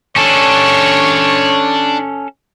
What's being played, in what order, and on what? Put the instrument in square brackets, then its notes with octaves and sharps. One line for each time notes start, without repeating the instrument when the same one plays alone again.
[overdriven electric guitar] C#4 A4 [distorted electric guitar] D4 [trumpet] C#5